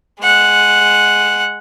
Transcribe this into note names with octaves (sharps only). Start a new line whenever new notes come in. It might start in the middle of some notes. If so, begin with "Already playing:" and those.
G#3 F#5